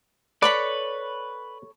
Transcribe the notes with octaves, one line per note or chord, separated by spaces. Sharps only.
A4 B4 C#5 D5 B5